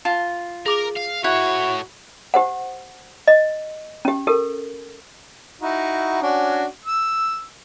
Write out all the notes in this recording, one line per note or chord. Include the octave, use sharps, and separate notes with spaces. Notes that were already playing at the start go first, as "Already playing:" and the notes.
F4 A5
G#4 A#4 D6 F7
F5
A2 E4 F#4 C#5 F#6
G4 C5 F#5
D#5
C#4 G4
G4 A4 A#4
D#4 E4 F#4
C#4 D4 F#4
E6